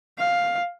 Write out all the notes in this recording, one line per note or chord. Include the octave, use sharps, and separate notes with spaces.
F5